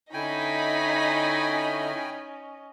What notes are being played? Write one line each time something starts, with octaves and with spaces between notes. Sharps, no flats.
D3 C#4 D#4 E4 D#5 G5 G#5 B5